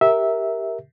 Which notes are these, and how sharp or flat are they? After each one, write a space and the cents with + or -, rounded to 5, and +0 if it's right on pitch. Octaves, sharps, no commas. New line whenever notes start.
G4 +0 A#4 +0 E5 -15